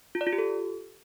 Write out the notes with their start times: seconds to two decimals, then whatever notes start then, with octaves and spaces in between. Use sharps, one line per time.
0.15 F4
0.21 D5
0.27 F4
0.33 G4
0.38 A4